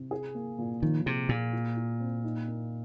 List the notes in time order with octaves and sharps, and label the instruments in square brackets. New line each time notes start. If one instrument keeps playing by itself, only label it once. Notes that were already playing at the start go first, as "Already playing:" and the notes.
Already playing: [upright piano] C3
G#4
A#3
A#2
[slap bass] D#3 [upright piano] F3
[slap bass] C3 [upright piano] G#4
[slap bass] A#2 [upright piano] G#4
[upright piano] F4
F4
C4
D#4
A#3